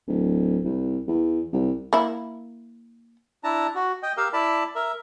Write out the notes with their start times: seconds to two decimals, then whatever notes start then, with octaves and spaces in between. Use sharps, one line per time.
0.08 D1
0.64 C2
1.07 E2
1.53 C2
1.93 A#3 E4
3.44 D4 E4 A5 A#5
3.75 F#4
4.03 D#5 G5
4.17 G4 A#4 F5 E6
4.33 E4 D5 A5 B5
4.76 A#4 E5